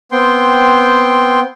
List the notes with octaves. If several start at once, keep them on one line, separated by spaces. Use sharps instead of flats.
B3 C4 G5 C6